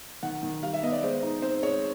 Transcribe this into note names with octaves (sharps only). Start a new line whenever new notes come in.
D#3 F#5
D#3
G3 F5
E5
B3 D#5
D5
G#3 C5
D#4
C4 C5
G#3 C#5